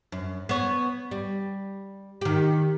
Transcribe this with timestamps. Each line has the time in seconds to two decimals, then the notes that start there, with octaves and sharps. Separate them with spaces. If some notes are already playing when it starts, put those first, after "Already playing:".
0.12 F#2
0.49 B3 C#5
1.11 G3
2.21 D#3 G4